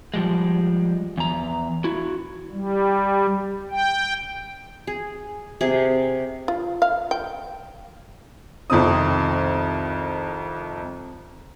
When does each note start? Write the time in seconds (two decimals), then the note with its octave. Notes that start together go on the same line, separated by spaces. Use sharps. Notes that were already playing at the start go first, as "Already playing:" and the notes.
0.14 F3 G3 G#3
1.17 E2 A#5
1.84 E4 F#4
2.52 G3
3.71 G5
4.87 G#4
5.61 C3 G#4
6.48 F4
6.82 F5
7.11 G5
8.70 C2 F2 D#3 C4 D#6